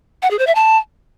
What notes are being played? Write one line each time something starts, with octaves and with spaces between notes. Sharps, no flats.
F#5
G#4
C5
E5
A5